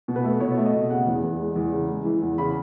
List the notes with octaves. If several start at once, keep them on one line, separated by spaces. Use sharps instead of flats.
B2
B4
A3
B2 C#5
A3
D#5
B2
C#3 F#5
E2
E2
G#3
E2
C#3
G#3
E3
E2
C#3 B5